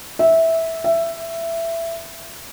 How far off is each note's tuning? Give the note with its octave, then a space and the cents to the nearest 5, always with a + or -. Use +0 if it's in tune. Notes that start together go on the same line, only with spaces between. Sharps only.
E5 -10
E5 +15